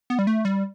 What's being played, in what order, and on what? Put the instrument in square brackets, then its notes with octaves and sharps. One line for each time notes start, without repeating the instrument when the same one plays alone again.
[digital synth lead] B3
G3
A3
G3